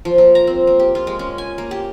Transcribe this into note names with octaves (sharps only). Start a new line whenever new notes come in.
F3
A#3
A#5
C4
A#3
G4
F4
G#3
C#4
G#5
A#3
G4